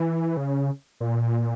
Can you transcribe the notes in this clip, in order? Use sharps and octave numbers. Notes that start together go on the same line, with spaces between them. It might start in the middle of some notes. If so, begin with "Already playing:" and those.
Already playing: E3
C#3
A#2